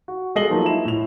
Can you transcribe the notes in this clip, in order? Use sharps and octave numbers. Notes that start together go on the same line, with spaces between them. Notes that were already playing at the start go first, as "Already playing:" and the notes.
F#4
G#3 A4 D#5 C7 F#7 G7
F3 F#3 A#3 D#4
E4 E7
A2 F7